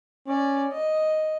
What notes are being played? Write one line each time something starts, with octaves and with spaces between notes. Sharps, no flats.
C#4 D5
D#5